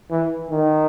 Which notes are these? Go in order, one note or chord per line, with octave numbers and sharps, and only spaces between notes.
E3
D#3